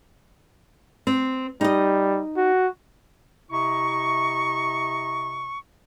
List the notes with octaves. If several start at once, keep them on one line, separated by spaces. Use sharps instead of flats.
C4
G3 D#4 D#5
F#4
C3 E4 D#5 A#5 C#6